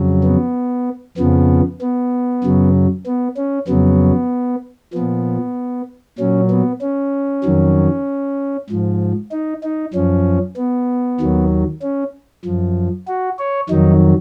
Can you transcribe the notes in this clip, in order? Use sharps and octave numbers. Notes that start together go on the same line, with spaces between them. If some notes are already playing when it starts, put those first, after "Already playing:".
Already playing: F2 C#3 F#3
B3
F2 C#3 F3 B3
B3
F#2 C#3 F#3
B3
C#4
F2 C#3 F#3 B3
A#2 F3 B3
A#2 F#3 C#4
B3
C#4
F2 D#3 F#3
G#2 F3
D#4
D#4
F#2 F3 C#4
B3
D#2 D#3 F#3
C#4
F#2 F3
F#4
C#5
F2 D#3 F#3 D#4